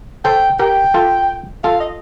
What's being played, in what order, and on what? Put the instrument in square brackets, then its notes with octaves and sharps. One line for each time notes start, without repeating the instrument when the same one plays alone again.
[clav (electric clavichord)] A4 C5 [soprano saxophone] G5
[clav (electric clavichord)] G4 A#4 [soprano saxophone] G5
[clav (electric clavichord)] F4 A4
[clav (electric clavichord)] F4 A4 [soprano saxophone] F5
[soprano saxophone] D#5